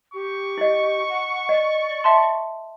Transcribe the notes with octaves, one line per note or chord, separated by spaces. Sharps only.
G4 C#6
E4 D#5
F#5
D5 D#5
E5 A5 C6